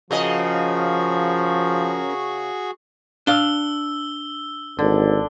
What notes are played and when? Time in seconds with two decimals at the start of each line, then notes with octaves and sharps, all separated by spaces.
0.11 C#3 F3 C#4 F#4 G#4 A#4 D#5 C#6
3.27 D4 F5 E6 G7
4.79 G#1 D3